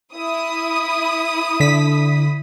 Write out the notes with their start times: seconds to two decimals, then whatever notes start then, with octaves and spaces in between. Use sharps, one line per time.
0.13 E4 D#6
1.60 D3 B6